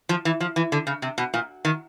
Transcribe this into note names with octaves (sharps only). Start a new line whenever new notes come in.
F3
E3
F3
E3
D3
C#3
C3
B2
A#2
D#3